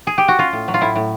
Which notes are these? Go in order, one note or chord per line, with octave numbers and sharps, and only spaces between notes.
G#4
G4
F#4
C#4 F4
A2
F#3
F4
A2 E4
A2